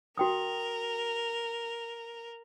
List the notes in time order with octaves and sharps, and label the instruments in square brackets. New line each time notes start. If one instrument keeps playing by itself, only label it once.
[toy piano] F#4 G5 D#6 [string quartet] A#4